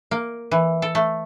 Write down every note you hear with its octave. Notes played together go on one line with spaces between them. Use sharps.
A#3
E3
A4
A3